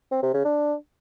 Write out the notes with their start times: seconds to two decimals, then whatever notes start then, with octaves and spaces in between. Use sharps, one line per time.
0.12 C4
0.23 C3
0.34 C#3
0.45 D4